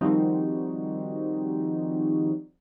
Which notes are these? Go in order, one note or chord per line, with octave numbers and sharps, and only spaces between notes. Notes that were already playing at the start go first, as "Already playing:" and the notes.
D#3 F3 G3 C4 D#4 F#4